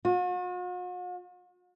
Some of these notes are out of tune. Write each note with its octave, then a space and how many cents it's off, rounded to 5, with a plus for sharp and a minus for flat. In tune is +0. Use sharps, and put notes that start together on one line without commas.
F#4 -45